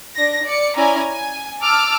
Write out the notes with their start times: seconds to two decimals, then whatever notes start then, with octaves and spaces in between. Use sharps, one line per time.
0.16 D4 A#6
0.44 D5 C#7
0.76 C#4 E4 D5 G#5 A#5
1.10 G#5
1.61 A5 D6 E6 F6